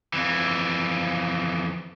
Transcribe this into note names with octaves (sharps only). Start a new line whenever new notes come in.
F2 E3